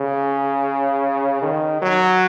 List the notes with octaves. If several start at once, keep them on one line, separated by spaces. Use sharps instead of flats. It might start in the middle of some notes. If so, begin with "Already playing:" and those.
Already playing: C#3
D#3
F#3